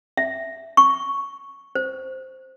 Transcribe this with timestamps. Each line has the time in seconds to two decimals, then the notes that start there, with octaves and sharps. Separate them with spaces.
0.17 E5
0.77 C#6
1.75 C5